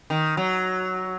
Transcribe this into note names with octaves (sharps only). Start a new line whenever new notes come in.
D#3
F#3